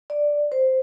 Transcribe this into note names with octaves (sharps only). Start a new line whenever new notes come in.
D5
C5